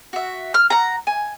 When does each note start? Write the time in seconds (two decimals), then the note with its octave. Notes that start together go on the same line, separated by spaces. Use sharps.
0.13 F#4 E5
0.54 F6
0.70 F#5 A#5
1.07 G#5